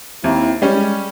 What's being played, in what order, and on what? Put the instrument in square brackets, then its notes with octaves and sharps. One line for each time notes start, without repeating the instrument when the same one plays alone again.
[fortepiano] D#2 [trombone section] C4 E4
[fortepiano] G3 C#4 [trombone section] G#3